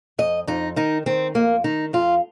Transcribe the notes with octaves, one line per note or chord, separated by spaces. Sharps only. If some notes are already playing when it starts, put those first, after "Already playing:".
F2 D#5
F2 D#4
D#3 D#4
D#3 C4
F2 A#3
D#3 D#4
F2 F4